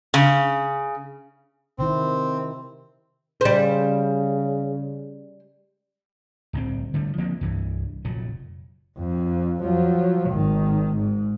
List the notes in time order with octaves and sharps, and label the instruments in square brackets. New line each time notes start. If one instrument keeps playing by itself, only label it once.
[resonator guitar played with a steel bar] C#3
[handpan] C3 D#3 E4 [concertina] C4
[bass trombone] C#3 [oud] G3 C5
[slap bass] D1 C2 C3 C4
D3 G3 A3
F3 A#3 C4
C2 G2 E3
F1 A#2 F#3
[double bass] F2
F3 F#3
G#1 D#3
G#2